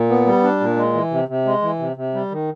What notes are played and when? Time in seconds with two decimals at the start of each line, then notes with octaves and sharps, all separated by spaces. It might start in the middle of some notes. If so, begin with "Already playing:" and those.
Already playing: A#2
0.09 B3
0.26 G3
0.43 D4
0.60 A#2
0.77 G#3
0.94 E3
1.11 C3
1.28 C3
1.45 G#3
1.62 E3
1.79 C3
1.96 C3
2.14 G3
2.31 D#3